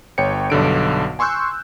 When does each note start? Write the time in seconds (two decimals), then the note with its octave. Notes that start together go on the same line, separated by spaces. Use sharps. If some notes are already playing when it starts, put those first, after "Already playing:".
0.18 G1 C#5 G5 C#7
0.50 B1 G2 D3 D7
1.19 G#5 C6 C#6 E6 F#6 G6